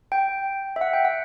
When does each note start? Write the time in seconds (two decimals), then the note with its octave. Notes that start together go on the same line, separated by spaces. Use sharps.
0.12 G5
0.76 E5
0.81 F#5
0.93 G5
1.05 F#5